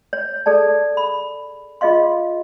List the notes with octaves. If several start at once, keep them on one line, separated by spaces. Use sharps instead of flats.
C#5
G#4 A4 D5 A5
B5
F4 G#4 D#5 F5 C6